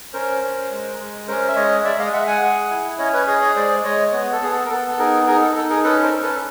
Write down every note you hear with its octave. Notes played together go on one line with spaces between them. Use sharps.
C#4 A#4 C5
C#4
G#3
G#3
C#4 A#4 C5
E5
G#3 C#5 D#5
G#3 D5 E5
D#5 F5
G#3 E5 F#5
F#5 G#5
G#4
E4
C#4 C#5 D#5
B4 C#5
G#4 C#5 D#5
C#5 D#5
G#3 C5 D5
G#3 C#5 D#5
B3 C#5 D#5
A4
B3 G#4
A4
A#4
B3 A4
A4
D#4 G#4 A#4
D#4 G#4 A#4
A4
D#4 A4
G#4 A#4
C#4 A4 B4
A#4 C5
C#4
A4 B4